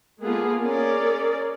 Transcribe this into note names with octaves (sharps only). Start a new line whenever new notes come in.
G#3 A#3 B3 F4 G#4 A4
C#4 G#4 A#4 D5